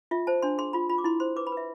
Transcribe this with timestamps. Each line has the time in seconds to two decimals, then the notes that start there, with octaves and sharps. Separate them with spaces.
0.11 F4 E5
0.27 C5 A5
0.42 D4 C6
0.58 G#4 C6
0.73 F4 B5
0.89 F4 B5
0.98 D6
1.04 E4 C6
1.20 C5 C6
1.36 B4 D6
1.47 B5
1.52 B4 E5